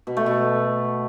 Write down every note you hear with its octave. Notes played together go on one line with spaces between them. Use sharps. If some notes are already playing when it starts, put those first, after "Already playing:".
B2
A3
B2